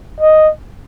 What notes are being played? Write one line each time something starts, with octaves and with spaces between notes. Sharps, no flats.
D#5